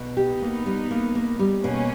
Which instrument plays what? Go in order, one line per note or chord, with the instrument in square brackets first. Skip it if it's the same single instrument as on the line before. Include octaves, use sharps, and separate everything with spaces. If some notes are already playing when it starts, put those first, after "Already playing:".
Already playing: [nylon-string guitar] B2
[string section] B3 D#4 [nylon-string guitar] G4
[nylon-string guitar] A#3
G3
A#3
A#3
G3
[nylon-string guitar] B2 [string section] A#3 C#4